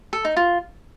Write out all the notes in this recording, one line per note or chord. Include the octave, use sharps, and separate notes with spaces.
A4
D#4
F4